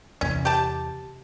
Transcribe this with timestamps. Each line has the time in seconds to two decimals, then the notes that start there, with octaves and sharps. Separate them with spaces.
0.21 E2 C3 C#4
0.45 G4 A5